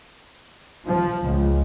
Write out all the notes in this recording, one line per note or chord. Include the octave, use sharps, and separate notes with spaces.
F3
C#2